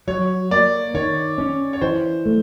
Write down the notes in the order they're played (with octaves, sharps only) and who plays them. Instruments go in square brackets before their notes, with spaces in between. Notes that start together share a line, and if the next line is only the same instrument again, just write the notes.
[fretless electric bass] F#3 [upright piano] C#5
[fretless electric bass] A#3 [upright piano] D5
[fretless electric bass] D#3 [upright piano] C#5
[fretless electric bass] C#4
[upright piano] C#5
[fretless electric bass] E3 [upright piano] C5
[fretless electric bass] A3